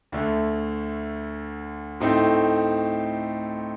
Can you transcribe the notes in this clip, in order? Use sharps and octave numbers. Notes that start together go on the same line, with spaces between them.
D2 D3 A3
A2 A3 C4 D#4